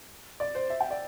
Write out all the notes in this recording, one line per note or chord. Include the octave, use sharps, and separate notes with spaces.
D5
C5
E5
G5
D5